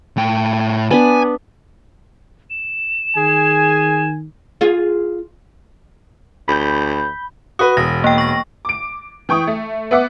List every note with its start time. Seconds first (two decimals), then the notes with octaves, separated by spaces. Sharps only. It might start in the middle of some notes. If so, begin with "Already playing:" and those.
0.17 A2 G5
0.91 B3 D4 B4 G#5
2.50 E7
3.17 D#3 G#4 G#5
4.61 F4 G#4
6.48 D2 B5 G6
7.59 F#4 B4 D#6
7.77 E1 A#6
8.04 A#3 G5
8.18 C#6 A#6
8.65 D6 D7
9.29 E3 G5 C#6 D#6
9.47 A3
9.91 B3 E5 F#5 D6